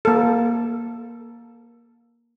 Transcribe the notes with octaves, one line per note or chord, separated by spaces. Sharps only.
A#3 A4